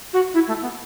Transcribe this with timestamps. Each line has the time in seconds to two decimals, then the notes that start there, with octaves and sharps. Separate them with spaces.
0.13 F#4
0.33 E4
0.47 A3
0.61 B3